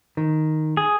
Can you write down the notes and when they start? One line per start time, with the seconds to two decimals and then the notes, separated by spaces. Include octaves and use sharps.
0.17 D#3
0.77 G#4